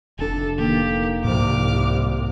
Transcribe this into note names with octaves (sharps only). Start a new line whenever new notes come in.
F1 D4 A4
D#3 A#3 G4
C2 G#2 C3 F3 D6 F6